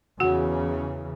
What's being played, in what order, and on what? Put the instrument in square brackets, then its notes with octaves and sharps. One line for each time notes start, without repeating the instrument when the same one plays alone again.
[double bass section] E2 C#3 E3 [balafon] F#4 F#5